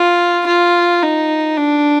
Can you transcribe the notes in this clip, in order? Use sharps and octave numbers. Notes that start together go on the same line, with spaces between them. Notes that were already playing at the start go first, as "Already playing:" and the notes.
Already playing: F4
F4
D#4
D4